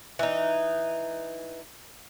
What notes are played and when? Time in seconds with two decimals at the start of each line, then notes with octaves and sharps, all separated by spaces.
0.19 E3 D#4